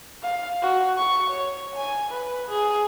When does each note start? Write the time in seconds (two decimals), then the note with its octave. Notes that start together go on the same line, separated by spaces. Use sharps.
0.22 F5
0.62 F#4
0.97 C#6
1.30 C#5
1.75 G#5
2.11 B4
2.48 G#4